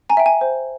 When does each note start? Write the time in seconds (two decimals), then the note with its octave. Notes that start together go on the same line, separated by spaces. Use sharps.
0.09 G#5 A#5
0.17 E5 G5
0.26 G#5
0.41 C5